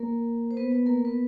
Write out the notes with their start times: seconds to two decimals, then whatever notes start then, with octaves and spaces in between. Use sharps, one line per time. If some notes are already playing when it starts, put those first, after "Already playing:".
Already playing: A#3 A#4
0.51 C5
0.57 B3 B4
0.71 B3 B4
0.86 A#3 A#4
1.05 B3 B4